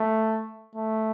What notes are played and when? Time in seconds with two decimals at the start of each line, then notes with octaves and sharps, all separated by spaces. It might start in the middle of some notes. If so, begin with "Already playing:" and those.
Already playing: A3
0.75 A3